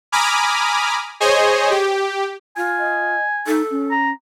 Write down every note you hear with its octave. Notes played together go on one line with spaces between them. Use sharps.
G#5 A#5 B5 D6 D#6 F6
G#4 C5 C#5 D#5 G#5
G4
F4 G#5
D#5
D#4 A4
C#4
A#5